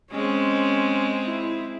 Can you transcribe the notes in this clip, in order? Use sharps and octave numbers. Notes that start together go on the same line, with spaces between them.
G#3 C4 C#4
E4